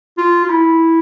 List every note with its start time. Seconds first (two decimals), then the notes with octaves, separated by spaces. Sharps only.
0.18 F4
0.45 F4
0.50 E4